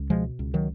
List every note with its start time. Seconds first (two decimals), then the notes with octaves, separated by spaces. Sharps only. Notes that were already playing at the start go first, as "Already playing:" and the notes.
Already playing: C#2
0.10 B2 F3 G#3
0.39 C#2
0.54 D#3 F#3